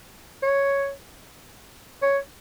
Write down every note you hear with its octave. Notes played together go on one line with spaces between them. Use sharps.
C#5
C#5